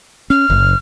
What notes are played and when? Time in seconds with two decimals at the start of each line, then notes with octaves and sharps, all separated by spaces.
0.30 C#4 F6
0.50 F#1